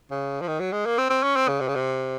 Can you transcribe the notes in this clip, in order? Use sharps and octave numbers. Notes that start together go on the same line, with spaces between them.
C#3
F3
D#3
F#3
G#3
A#3
C4
C4
C#4
C4
C#3
C3
C#3
C3